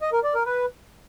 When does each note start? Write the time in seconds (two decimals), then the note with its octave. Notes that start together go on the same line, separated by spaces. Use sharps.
0.01 D#5
0.12 A#4
0.24 D5
0.35 A#4
0.46 B4